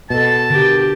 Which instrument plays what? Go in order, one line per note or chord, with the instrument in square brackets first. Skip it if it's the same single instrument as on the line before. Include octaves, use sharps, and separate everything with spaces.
[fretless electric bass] B2 [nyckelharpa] A4 [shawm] A5
[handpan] D3 [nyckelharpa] G4 A#4